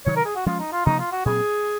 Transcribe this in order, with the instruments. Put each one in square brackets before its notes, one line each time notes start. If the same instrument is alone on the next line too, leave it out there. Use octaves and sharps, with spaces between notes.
[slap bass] C3 D#3 F#3 [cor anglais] C#5
[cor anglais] A#4
G#4
F#4
[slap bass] F3 G#3 C#4 [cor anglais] F4
[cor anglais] D#4
F4
[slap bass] C3 F3 A#3 [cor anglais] D#4
[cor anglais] F4
F#4
[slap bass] A#2 F#3 C4 [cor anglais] G#4